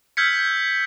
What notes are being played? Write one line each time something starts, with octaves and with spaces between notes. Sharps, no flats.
E6 F6 G6 G#6 B6 C#7